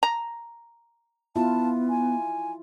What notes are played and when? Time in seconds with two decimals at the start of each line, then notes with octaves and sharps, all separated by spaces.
0.03 A#5
1.36 B3 E4 F4 A5
1.90 G#5